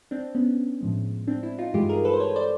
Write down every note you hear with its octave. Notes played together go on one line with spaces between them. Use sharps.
C4 D4
B3 C#4
A2 F3 G#3
C4 D4
D4 E4
D#4 F4
G2 E3 G#3 F4 G4
G#4 A#4
A4 B4
C5
B4 C#5
C5 D5